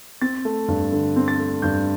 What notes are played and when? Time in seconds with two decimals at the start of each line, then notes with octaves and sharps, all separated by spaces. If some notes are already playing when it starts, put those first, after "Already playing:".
0.22 C4 A6
0.45 A3
0.68 G2
0.92 D3
1.16 C4
1.28 A6
1.39 A3
1.62 G2 G6